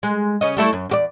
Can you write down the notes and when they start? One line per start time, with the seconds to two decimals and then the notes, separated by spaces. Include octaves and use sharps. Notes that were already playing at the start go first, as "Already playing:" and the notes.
0.03 G#3
0.41 C#3 C#4 D#5
0.57 G3 A3 E4
0.73 F#2
0.89 E2 G4 D5